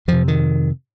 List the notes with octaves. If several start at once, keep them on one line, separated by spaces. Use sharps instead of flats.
F2 C3 F3
D#3